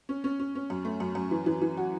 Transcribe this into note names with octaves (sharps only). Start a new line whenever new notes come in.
C#4
C#4
C#4
C#4
F#2
A3
F#2
F#2
E3
E3
E3
F#4